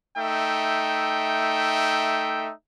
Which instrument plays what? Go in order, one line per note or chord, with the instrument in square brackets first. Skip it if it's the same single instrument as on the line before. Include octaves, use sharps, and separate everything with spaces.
[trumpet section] A3 D#4 E5 G5